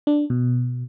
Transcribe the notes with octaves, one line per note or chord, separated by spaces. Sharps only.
D4
B2